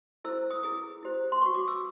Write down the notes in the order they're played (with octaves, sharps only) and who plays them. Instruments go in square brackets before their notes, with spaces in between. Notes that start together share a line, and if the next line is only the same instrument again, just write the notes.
[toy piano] E4 A4 C5 E6
D#6
E4 G#4 B4 D#6
E4 G4 C5
C6
B4 C#6
F#4
D6
E6